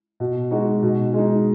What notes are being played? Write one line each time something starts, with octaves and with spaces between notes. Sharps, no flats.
B2
G#3 D#4 F#4
B2
G#3 D#4